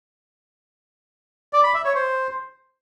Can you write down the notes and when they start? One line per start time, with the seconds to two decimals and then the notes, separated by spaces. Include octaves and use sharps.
1.53 D5
1.64 B5
1.74 E5
1.84 C#5
1.95 C5